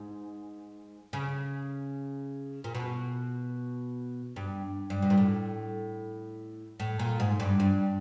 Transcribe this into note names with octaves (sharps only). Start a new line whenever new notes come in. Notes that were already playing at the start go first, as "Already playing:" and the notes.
Already playing: G#2
C#3
A#2
B2
G2
G2
B2
A#2
A2
A2
A#2
G#2
G2
G2